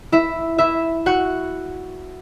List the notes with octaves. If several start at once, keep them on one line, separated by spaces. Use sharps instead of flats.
E4 E5
E4 E5
F#4 F#5